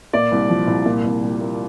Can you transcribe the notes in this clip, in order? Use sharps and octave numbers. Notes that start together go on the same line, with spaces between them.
A#2 D5
C2
F3
C2
A#2
C2
G3
A#3